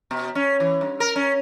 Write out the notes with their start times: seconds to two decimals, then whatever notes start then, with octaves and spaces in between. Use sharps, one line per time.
0.11 B2
0.35 C#4
0.60 E3
0.81 G2
1.00 A#4
1.16 C#4